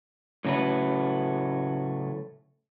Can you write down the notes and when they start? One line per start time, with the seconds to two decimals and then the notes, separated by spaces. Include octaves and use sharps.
0.45 A2 C#3 F#3 A3 B4